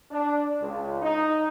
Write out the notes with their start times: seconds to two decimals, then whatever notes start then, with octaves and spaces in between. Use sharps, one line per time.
0.11 D4
0.61 C#2
1.02 D#4